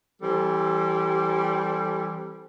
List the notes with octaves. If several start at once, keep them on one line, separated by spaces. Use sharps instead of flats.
E3 G3 C4 A4